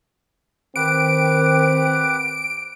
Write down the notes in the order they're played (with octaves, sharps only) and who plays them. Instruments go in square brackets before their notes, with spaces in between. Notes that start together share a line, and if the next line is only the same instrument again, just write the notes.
[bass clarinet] D#3 [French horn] C4 [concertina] G4 B4 F#5 [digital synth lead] D7